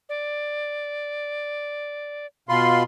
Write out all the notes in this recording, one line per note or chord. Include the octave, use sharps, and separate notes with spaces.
D5
B2 F4 B5 C6